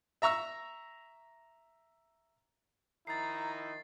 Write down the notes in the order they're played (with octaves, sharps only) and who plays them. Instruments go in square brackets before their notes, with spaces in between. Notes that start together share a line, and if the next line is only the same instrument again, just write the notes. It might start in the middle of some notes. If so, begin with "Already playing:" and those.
[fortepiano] E5 A#5 C#6 E6
[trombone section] D#3 F3 D#4 [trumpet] E4 [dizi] A#5 [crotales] A6 C7